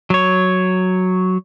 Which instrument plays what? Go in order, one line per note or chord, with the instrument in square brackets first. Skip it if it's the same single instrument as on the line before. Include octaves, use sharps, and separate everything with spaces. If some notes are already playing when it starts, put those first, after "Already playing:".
[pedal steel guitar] F#3 C#5